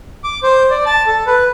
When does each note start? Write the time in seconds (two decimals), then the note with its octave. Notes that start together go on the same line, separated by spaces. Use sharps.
0.24 D6
0.43 C5
0.70 D5
0.86 A5
1.07 A4
1.27 B4